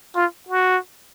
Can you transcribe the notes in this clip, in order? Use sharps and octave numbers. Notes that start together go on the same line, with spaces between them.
F4
F#4